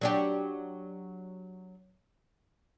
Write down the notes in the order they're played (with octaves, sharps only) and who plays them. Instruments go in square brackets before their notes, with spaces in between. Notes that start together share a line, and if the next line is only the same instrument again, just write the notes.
[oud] F#3 D4 G4